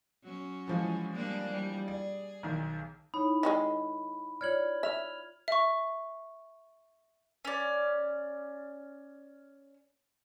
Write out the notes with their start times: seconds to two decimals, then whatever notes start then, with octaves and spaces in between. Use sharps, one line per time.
0.23 F#3 C#4
0.68 E3 F3 G#3
1.13 G3 A#3 D4
1.50 G3
1.88 G#4 D5
2.43 B1 D#3
3.14 D#4 E4 C#5 B5
3.43 D#3 F#3 G#3
4.41 F4 C#5 D5 F6 G#6 F#7
4.83 E5 F6 F7
5.48 E5 C#6
7.45 C#4 D5